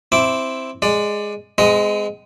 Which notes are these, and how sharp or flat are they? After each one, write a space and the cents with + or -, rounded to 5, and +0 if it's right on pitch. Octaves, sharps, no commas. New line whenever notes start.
C4 +0 E4 +0 D6 -10
G#3 +0 D5 +15
G#3 +0 C4 -45 D#5 +0